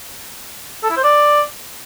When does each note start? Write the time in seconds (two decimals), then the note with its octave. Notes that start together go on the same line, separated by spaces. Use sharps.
0.84 A4
0.90 E4
0.97 C5
1.04 D5